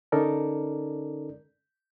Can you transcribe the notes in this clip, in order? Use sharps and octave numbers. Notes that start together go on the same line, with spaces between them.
D3 C#4 D#4 A4 A#4 D5